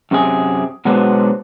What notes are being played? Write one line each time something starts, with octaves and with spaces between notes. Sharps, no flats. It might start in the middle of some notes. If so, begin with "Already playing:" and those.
F#2 C3 C4 G#4
B2 F#3 G#3 B3 D4 C5